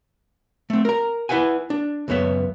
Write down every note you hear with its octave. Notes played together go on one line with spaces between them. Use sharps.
A3 C4
A#4 A#5
E4 B4 E5 F#5 G#5
D4
C#2 F#2 B3 C#5 E5